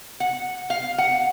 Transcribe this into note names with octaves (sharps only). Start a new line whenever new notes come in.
F#5
F5
F#5